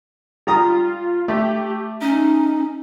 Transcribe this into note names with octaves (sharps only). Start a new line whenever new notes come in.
G3 F4 A#5 D#6
A3 G4
C#4 D#4